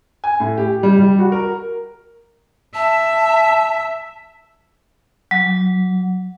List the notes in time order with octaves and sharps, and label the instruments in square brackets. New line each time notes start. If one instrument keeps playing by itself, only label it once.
[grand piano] G#5
A2
G4
G3
G3
F#4
A#4
[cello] E5 [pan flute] A5
[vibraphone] F#3